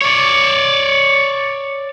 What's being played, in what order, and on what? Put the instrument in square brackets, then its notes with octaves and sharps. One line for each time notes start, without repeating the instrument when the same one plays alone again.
[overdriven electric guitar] C#5 D5